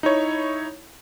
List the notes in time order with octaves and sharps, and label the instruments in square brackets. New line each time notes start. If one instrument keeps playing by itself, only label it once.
[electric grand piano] D#4 E4 C#5